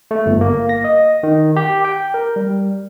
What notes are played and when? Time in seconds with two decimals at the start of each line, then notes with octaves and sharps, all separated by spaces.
0.11 A3
0.26 G1
0.41 A#3
0.69 A#6
0.84 D#5
1.23 D#3
1.56 G4
1.85 G5
2.14 A#4
2.36 G3